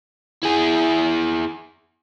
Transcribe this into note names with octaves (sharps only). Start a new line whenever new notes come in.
E4 G#4